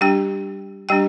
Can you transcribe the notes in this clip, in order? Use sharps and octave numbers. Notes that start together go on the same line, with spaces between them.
G3 D4 G4 G5
G3 D4 G4 G5